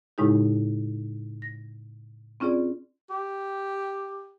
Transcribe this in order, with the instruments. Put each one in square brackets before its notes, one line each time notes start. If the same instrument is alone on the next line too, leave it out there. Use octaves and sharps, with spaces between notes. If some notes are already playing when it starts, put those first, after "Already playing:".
[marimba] A2 C#3 G#3 D#4 E4 G4
A#6
C4 C#4 F4 G#4 D5
[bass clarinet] G4